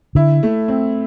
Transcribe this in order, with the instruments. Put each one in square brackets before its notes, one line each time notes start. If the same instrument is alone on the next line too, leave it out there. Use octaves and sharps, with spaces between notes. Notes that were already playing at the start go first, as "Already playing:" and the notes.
[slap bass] D3 [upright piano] E4
[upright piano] A3
C4